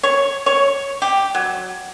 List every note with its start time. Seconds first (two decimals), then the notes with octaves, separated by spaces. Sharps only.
0.03 C#5
0.46 C#5
1.02 G4
1.35 F#3